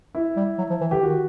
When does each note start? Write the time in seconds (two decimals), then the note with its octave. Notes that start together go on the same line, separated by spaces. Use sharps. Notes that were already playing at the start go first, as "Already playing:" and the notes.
0.15 E4
0.36 G3
0.58 F#3
0.70 F3
0.81 E3
0.91 D3 G4
1.03 D#3 F#4